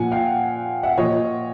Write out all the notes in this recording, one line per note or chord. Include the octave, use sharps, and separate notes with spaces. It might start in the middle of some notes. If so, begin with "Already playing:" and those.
Already playing: A#2 F3 F#5 G#5
F5 G5
E5 F#5
A#2 F3 C#5 D#5